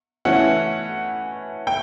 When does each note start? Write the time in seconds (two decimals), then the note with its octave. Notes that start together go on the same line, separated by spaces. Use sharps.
0.25 E3 A3 C#4 E4 F#5
1.67 G5